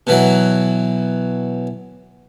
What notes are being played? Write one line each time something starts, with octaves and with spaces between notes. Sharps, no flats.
B2 E3 F#3